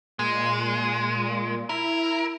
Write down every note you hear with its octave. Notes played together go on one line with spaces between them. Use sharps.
A#2 G#3
E4 A#4